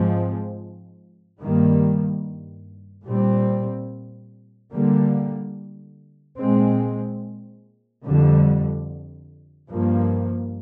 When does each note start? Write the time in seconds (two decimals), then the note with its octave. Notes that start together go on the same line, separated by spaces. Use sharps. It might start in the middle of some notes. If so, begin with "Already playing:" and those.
Already playing: G#2 F3 G#3 C4
1.41 G2 D#3 G3 A#3
3.06 A#2 G3 C4
4.72 D3 G3 A#3
6.38 A#2 G#3 C4
8.05 F2 D3 G3
9.70 G2 F3 A#3